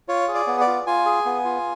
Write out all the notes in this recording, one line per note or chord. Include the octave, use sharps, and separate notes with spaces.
F4 C#5
G#4
D5
B3
D5
F4
F4 G#5
G#4
B3
F4